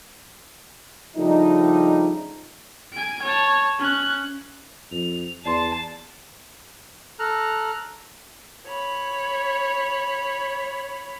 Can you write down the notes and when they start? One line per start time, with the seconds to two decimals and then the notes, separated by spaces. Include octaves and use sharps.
1.16 C#3 F3 G3 A3 D4 D#4
2.93 G#5 D7
3.22 C#5 A5
3.79 C#4 F#6
4.92 F2 F7
5.46 E2 D5 A5 C6 C7 E7
7.19 A4 A#5 F6 F#6
8.67 C#5 B5